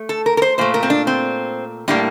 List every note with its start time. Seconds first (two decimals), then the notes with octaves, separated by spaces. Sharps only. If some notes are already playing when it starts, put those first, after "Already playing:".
Already playing: A3
0.09 A4
0.26 A#4
0.37 A#4
0.42 C5
0.58 A#2 A3 C5
0.74 A#4
0.83 C4
0.90 D4
1.07 C4
1.88 A2 G3 A#3 D4